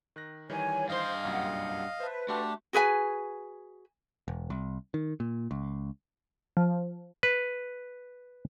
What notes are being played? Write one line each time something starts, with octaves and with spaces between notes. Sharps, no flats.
D#3 F#6 A#6
D#3 E3 G3 C#5 G#5
G2 C5 D#5 F5 C6
C2 F#2 A#2 F#5
B4 C5 E5 A5
A3 D4 F#4 G4 C6
F#4 G#4 B4 G#5
E1
C2
D#3
A#2
C#2
F3
B4